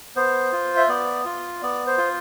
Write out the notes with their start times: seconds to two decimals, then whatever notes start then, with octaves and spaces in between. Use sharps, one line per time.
0.16 B3 C5
0.52 F4
0.77 E5
0.89 B3 D5
1.25 F4
1.62 B3 D5
1.87 C5
1.98 F4